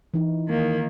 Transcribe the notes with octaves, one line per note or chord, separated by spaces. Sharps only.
E3 D#4 E4
D#3 A#3